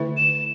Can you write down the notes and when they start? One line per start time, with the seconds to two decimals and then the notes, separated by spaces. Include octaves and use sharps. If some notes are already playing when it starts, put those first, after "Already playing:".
Already playing: D3 A3 E4 A4 E5
0.17 E7